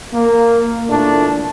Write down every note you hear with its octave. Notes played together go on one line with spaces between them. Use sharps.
A#3
E2 A#2 A3 D4